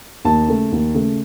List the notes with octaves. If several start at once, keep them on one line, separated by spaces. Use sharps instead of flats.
D#2 A5
C#3 A3
D#2
C#3 A3